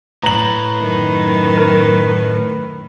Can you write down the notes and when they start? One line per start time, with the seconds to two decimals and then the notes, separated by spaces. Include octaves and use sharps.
0.24 A2 B4 A#5 F#7
0.82 F#2 D#3
1.57 A#4